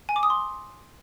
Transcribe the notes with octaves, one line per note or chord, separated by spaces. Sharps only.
G#5
D6
D#6
C6